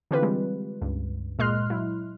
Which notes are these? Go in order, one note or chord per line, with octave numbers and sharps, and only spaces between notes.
D3 E3 C4 F4 G4 B4
G3 G#3
C#2 G2
A#2 G#3 D#5 C6 F6 F#6
F#3 E4